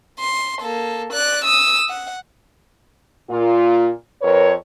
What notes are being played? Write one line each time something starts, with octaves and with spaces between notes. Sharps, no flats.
C6
A#3 A4
D5 F#6
D#6 E6
F#5
A#2 F4
F2 A#4 B4 C#5